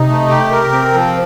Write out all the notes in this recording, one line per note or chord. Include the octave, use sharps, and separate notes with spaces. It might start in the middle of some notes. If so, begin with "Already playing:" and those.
Already playing: C3 D#4
A3
G4
A#4
C4
F3